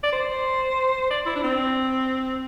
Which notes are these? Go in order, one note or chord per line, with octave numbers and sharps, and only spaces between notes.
D5
C5
D5
E4
D4
C4